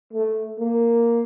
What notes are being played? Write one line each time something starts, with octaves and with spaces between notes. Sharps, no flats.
A3
A#3